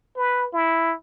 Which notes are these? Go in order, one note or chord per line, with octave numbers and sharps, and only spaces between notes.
B4
E4